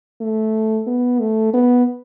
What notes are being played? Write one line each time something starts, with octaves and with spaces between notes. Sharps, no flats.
A3
B3
A3
B3